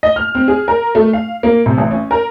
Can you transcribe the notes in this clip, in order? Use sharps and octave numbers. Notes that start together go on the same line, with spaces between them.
D#5
F6
C4
G#4
A#4
A3
F5
A#3
C3
A1
C#4
A#4